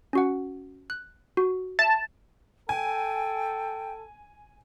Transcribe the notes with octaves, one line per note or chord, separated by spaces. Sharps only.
C#4 F#4 F#5
F#6
F#4
E5 A5
A4 G5 G#5